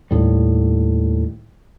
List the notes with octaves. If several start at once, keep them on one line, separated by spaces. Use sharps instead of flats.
D#2 A2 G3